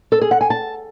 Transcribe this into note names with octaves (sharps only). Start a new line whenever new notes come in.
A4
G#4
F#5
G#5
A5